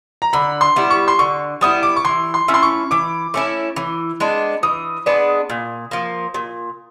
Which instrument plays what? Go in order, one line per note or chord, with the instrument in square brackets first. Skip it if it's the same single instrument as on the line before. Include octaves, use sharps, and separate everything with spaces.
[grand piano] A#5
[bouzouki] D3 [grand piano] B5
[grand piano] C6
[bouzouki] G3 B3 E4
[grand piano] C#6
C6
[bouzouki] D3 [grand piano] C#6
[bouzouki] G3 B3 E4 [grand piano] D#6
[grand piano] D6
C#6
[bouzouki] E3 [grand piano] C6
[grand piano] C6
[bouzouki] A3 C#4 E4
[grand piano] C6
C#6
[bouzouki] E3 [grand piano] D6
[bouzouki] A3 C#4 E4
E3
G#3 B3 D4
[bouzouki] E3 [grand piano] D#6
[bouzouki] G#3 B3 D4
A#2
F3 A#3
A#2